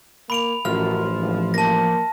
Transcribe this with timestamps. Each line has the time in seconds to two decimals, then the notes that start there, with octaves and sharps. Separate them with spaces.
0.30 A#3 B5 D7 F7
0.65 A1 F#2 F3 F6
1.19 G#1
1.54 A#3 A5 A#6